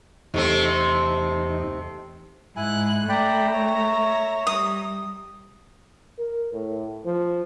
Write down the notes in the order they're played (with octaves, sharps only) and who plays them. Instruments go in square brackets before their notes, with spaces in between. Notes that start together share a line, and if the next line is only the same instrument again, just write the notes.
[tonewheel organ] E2 D#4 [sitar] C3 A3 C4
[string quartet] G#2 F#6 [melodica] E4 G#5
[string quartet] A3 [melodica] D5 G5 B5 [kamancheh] E5 A#5
[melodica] C#5
[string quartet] G3 [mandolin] D#6
[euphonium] A#4
A2
F3